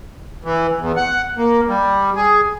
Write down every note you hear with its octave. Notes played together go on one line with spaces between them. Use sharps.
E3
E2
F#5
A#3
G3
G#4